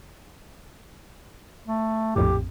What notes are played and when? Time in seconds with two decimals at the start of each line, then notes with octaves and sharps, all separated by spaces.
1.66 A3
2.16 A#1 F2 A2 G4